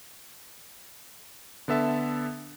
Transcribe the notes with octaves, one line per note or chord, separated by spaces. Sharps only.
D3 B3 A4 E5 A5